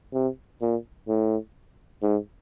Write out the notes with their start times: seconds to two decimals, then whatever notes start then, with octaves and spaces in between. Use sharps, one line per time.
0.14 C3
0.61 A#2
1.08 A2
2.02 G#2